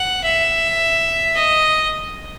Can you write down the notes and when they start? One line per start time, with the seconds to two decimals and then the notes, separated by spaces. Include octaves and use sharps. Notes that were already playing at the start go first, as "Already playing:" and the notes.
Already playing: F#5
0.24 E5
1.35 D#5